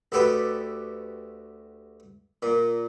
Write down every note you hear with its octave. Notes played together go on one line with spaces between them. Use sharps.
D2 F#4 G4 A4 B4 D#6
A#2